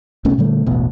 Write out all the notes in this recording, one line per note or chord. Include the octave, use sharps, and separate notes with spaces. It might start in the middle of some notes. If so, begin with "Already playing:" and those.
C2 B2 A3 C#4
A#2 D3 G3 A3
E1 A1 B2